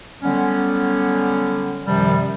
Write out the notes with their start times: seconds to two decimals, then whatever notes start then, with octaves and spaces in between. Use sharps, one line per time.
0.23 D3 F#3 G3 B3 C#4
1.86 F#2 C3 D#3 F3 G3